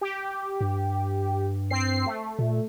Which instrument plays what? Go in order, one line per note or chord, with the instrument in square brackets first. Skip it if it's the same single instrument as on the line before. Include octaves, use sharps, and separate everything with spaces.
[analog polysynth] G4
[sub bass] G2
[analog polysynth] C4 C7
A3
[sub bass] A#2